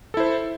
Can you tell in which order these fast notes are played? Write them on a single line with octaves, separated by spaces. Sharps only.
A4 E4 C5